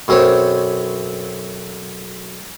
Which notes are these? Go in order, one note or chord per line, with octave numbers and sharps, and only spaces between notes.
B1 F#2 C4 C5 C#5